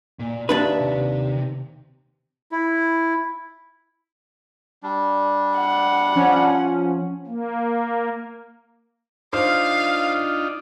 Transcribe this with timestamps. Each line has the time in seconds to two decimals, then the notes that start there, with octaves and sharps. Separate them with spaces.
0.19 A#2
0.49 D#2 D4 B4 E5
0.80 C3
2.52 E4
4.83 G3 D4
5.57 F#5
6.15 F3 C#4
7.27 A#3
9.33 D4 D#4 F4 C5 F5